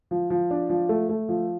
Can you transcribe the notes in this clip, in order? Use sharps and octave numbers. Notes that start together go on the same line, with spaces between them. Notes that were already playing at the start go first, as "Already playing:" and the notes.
F3
F3
D4
F3
A3
A3
F3